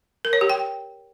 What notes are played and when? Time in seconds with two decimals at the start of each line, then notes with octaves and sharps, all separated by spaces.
0.25 A#4
0.33 C#5
0.41 G4
0.50 G5